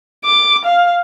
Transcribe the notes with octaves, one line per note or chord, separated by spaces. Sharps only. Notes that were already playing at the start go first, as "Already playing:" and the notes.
D6
F5